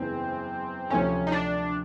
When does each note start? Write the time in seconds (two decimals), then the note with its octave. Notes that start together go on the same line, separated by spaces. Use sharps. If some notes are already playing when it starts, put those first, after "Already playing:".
Already playing: F#1 E2 E3 G#3 C4
0.90 D2 C3 F3 C#4
1.27 D#4
1.32 D4